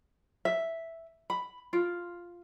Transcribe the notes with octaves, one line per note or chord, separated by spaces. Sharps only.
E5
B5
F4